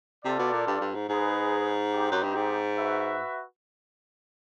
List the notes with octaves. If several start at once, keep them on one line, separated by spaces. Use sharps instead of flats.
C3 F4 A4 D5
B2
A#2
G2
G2
G#2
G#2 D#4 G#4 B4
C4 D#4 G4
F#2
G2
G#2
F#4 B4 E5